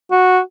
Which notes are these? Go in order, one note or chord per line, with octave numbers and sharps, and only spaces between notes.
F#4